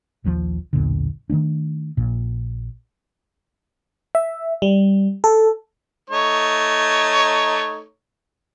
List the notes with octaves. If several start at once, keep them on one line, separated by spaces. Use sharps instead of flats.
A#1 D#2 E3 F3
B1 E2 A#2 D3
D#3 E3 A3 D4
A#1 A#2
E5
G3
A4
A3 D#4 C#5